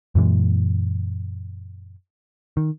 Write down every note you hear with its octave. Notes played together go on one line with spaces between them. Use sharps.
F#2 A#2 E3 G#3
D#3